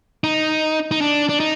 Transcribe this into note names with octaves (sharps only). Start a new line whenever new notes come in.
D#4
D#4
D4
D4
D#4